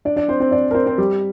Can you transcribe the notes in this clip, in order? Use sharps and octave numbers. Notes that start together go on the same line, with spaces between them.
D4 D5
D4 D5
C4 C5
C4 C5
D4 D5
A#4
C4 C5
C4 C5
G3 G4